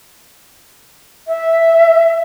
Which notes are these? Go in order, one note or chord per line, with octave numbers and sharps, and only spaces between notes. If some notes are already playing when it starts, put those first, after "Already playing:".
E5